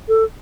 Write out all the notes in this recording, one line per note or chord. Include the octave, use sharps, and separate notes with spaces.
A4